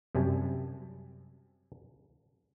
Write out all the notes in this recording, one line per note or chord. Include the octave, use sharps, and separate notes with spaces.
F#2 C3 G3 G#5 A5